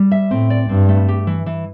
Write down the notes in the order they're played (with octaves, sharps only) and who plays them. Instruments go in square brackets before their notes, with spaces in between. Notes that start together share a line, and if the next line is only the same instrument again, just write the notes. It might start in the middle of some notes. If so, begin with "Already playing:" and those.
Already playing: [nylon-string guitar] G3
E5
[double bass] A2 [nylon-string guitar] C4
[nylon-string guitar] D5
[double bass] G2 [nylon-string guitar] C4
[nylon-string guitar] A3
G4
E3
E3